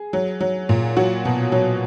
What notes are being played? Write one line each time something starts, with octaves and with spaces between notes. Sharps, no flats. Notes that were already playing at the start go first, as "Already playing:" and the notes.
Already playing: G#4
F#3
F#3
A#2
F#3 F#4
B2
F#3